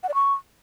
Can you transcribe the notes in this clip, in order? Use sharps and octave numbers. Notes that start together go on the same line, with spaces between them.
F#5
D5
C#6